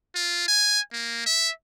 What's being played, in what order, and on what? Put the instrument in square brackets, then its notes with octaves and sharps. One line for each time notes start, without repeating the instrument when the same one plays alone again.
[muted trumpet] F4
G#5
A#3
E5